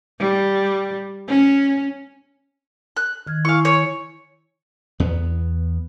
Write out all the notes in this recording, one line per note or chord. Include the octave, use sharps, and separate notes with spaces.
G3
C#4
F#6
D#3 F6 G#6
E4 F5 G#5 C#6
C#5
E2 B3